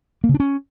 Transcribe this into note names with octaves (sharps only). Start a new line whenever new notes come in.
A#3
C#3
D4
C#4